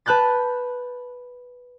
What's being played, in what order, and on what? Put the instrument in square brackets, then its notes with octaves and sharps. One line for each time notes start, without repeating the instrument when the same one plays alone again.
[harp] B4 A5 F#6 G6 A6